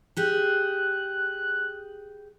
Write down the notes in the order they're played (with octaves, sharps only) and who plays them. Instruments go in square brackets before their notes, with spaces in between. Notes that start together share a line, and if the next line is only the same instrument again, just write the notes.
[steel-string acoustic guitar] G4 G#4 [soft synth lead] F#6